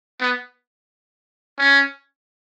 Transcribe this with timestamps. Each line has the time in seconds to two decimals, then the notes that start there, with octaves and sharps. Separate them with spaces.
0.21 B3
1.58 C#4